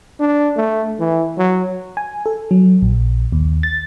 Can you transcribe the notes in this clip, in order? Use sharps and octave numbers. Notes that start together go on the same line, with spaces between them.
D4
A3
E3
F#3
G#5
A4
F#3
A#1
D#2
A6